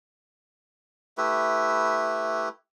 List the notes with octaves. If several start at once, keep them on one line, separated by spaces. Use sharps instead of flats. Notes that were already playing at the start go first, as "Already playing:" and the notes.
A3 E4 G4 B4